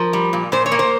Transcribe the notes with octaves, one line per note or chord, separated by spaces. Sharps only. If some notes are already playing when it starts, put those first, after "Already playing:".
Already playing: F3 A#4
G3
A#2
A#2 C5
C#5
A#3
C5